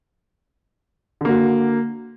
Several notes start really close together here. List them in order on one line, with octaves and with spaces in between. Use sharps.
D3 A#3 F#4